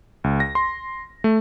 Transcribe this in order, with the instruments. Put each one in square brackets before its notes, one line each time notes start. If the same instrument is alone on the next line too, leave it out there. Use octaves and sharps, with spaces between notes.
[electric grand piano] C#2
A#6
C6
A3